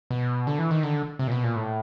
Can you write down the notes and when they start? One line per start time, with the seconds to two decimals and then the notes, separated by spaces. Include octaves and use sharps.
0.11 B2
0.47 D3
0.59 E3
0.71 D#3
0.83 D3
1.19 C3
1.27 A#2
1.32 B2
1.44 A#2
1.56 A2